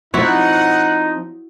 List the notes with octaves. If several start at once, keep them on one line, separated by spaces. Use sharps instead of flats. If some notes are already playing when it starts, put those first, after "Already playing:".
F3 C4 D#4 E4 F#4 C#5 F#5